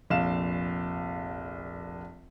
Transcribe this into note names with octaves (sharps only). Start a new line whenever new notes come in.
F1 A#1 F5 E7